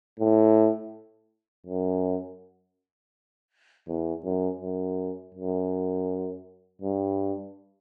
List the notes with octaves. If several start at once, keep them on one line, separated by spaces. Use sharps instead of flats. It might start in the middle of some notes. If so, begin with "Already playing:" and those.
A2
F#2
E2
F#2
F#2
F#2
G2